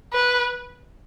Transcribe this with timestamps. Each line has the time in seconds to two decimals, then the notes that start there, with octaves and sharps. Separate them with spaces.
0.13 B4